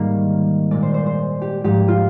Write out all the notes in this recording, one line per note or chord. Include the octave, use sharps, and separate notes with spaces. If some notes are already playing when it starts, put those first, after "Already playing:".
Already playing: G#2 D#3 G3 A#3
A#2 G#3 D5
C5
C5
C5
G4
G#2 F3 A#3 G4
F4